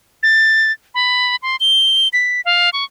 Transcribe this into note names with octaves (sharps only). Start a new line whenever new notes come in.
A6
B5
C6
G7
B6
F5
C#6